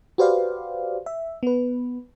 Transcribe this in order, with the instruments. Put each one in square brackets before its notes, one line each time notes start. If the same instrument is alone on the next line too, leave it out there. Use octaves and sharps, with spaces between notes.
[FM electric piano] F#4 G4 B4 C5 D5 F5
E5
B3 B4